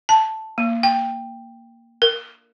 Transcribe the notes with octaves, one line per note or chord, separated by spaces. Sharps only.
A5
A#3
G5
A#4